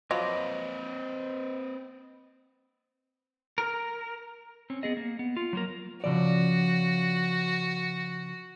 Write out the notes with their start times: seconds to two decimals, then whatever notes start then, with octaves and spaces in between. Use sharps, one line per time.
0.11 F3 F#3 C4 F4 B4 D#5 D6
3.58 A#4
4.70 C4 C#4
4.83 B3 G#4 D#5
4.97 A#3
5.19 B3
5.37 F4
5.53 F#3 A#3 A#4
6.04 C#3 F3 F#4 D5